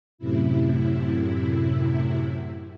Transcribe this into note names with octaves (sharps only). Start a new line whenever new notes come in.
F#2 A2 C3 E4